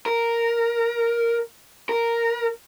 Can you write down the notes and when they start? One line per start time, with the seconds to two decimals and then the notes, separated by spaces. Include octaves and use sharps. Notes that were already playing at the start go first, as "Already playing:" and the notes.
0.06 A#4
1.89 A#4